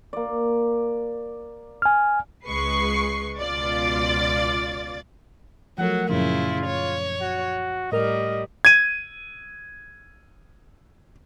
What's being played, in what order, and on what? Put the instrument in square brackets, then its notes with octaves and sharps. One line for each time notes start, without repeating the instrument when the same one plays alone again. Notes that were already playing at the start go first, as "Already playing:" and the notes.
[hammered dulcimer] A#3 D5
[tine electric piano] G#5 F6
[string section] C#2 G#3 B4 C#6 C7
C#2 B2 F4 D5 D6 A6
[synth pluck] F3 A3 A#4 [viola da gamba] F#3 [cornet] F#5
[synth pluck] F#2 A#2 F3 [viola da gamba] C#3 E4 [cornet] F4
[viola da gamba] C#5
[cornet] F#4
[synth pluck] A2 A#4 F6 [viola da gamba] G3 [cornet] D#5
[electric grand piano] G#6 D#7